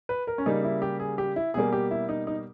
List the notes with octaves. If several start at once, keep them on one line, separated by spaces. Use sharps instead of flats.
B4
A#4
C#4
C#3 G3 A#3 D#4
E4
G4
G#4
G4
E4
B2 G3 A#3 G#4
G4
E4
D#4
D#4